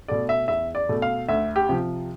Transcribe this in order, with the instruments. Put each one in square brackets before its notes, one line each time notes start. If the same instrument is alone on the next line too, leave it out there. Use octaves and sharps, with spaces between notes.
[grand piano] B2 A3 D5
E5
E2 E5
D5
B2 A3
F5
D2 E5
G4
C3 F3